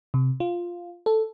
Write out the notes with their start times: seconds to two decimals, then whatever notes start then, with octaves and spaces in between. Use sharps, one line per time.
0.14 C3
0.40 F4
1.06 A4